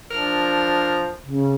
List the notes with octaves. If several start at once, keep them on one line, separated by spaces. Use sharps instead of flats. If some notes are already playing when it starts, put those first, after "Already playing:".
F3 D4 A#4
C#3